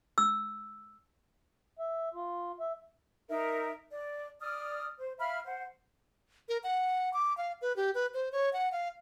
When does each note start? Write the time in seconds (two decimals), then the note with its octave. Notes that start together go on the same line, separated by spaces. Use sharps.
0.18 E6
1.79 E5
2.14 F4
2.60 E5
3.29 D#4 A#4 E5
3.91 D5
4.40 D5 D#6 F6
5.00 C5
5.19 E5 F5 B5 F6
5.44 C5 F#5
6.49 A#4
6.64 F#5
7.14 D6
7.37 F5
7.62 B4
7.76 G4
7.95 B4
8.14 C5
8.32 C#5
8.53 F#5
8.72 F5